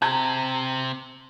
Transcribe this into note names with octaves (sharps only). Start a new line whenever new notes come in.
C3 C4 A5 A#5 G#6